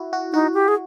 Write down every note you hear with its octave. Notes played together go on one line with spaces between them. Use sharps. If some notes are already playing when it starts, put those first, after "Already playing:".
Already playing: E4 F#4
F#4
D#4 F#4
G4
G#4